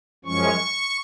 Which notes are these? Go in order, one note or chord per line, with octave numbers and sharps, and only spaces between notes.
F#2 F3 G#3 C#4 C#6